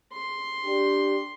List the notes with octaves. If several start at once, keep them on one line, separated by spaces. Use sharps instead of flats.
C6
D4 G4